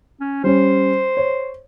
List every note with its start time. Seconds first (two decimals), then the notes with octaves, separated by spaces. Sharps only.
0.21 C#4
0.44 G3 C#4 C5
1.17 C#5